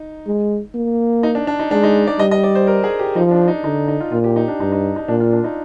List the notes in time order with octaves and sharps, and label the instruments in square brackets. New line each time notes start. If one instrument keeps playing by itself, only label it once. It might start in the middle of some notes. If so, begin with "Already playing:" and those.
Already playing: [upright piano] D#4
[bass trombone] G#3
A#3
[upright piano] D#4
D4
D4
D#4
[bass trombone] G#3 [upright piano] D4
[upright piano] D#4
D5
[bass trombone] G3 [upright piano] D#5
[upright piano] D#5
D5
C5
A#4
G#4
G4
[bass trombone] F3 [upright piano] D#4
[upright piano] D4
D#4
[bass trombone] D3 [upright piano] D#4
[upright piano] D#4
F4
[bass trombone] A#2 [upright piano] F4
[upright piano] G4
D#4
D4
[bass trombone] G2 [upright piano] D#4
[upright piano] D#4
D#4
[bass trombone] A#2 [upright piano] D4
[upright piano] F4
D4
D#4